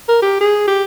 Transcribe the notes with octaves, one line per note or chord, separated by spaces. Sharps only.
A#4
G4
G#4
G4